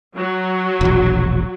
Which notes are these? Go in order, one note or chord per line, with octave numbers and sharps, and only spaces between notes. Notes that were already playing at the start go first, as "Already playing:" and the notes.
F#3
E1 A#1